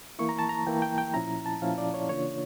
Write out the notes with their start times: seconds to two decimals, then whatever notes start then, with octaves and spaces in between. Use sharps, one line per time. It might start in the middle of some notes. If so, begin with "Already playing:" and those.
0.19 E3 A#3 E4 C#6
0.29 A#5
0.39 A5
0.49 A#5
0.67 E3 A#3 E4 G5
0.82 G5
0.98 G5
1.14 A#2 F3 C#4 E4 A#5
1.46 A5
1.62 A#2 F3 C#4 E4 F5
1.78 D5
1.94 C#5
2.09 C#3 E3 A#3 D4 F4 C#5